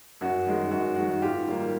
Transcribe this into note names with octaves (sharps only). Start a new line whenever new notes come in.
F#2 F#4
D#3 G#3
F#2 F#4
D#3 G#3 F#4
G#2 F4 G4
D#3 G3 A#3